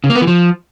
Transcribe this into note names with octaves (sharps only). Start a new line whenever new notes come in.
C#3
A#3
B3
E3
F3